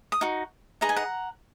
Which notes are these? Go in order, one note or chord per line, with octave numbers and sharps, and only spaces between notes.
D#6
D#4 F#4
D#4 G#4 B4 D#5 A#5
G#5
F#5 A#5